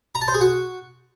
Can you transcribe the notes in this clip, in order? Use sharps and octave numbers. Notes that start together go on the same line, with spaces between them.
A#5
A5
C5
G#4
F#4